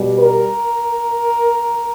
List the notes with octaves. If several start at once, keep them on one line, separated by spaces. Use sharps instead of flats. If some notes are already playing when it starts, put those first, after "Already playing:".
Already playing: B2 G3
A#4